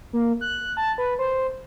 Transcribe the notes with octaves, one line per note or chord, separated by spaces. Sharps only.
A#3
F#6
A5
B4
C5